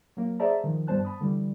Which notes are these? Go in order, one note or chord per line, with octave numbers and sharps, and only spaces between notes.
F#3 A#3
G#4 C5 D5 E5 A5 A#5
D#3 F3
G2 G3 B3 C5 A5 F#6
A5 B5 D#6
D3 E3 G3